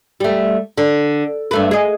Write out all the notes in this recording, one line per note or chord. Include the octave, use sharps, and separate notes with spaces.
G3 A3
D3
G2 A3 B4
G#4 D#5